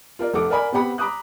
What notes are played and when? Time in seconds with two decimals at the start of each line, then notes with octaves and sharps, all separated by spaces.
0.19 F4 A#4 D5
0.33 F1 A4 F#5 D6
0.50 A#4 D5 F#5 G#5 B5
0.72 B3 C4 G4 F#5 B5
0.98 A#5 B5 D6 D#6 F#6